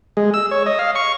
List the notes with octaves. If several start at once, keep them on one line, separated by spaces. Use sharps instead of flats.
G#3
E6
C#5
D#5
F5
C#6